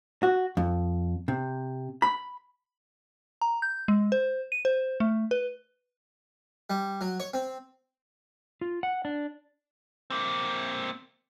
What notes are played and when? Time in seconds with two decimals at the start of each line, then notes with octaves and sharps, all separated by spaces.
0.23 F#4
0.57 F2
1.28 C3
2.02 B5
3.42 A#5
3.62 G6
3.88 G#3
4.12 C5
4.52 D#7
4.65 C5
5.00 A3
5.31 B4
6.70 G3
7.01 F#3
7.20 C#5
7.34 C4
8.61 F4
8.83 F#5
9.05 D4
10.10 A#3 C4